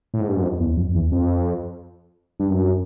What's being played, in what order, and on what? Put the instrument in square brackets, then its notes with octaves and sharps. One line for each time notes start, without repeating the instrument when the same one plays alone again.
[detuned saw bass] A2
G#2
G2
F#2
F2
E2
F2
E2
F2
G2
F#2